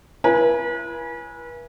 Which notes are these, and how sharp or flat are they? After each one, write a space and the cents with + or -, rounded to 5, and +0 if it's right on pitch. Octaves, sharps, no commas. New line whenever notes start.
E4 +35 B4 -40 G#5 +0